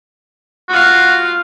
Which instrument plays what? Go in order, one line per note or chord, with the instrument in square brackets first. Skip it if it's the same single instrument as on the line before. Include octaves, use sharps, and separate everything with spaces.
[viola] F4 F5 [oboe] F#4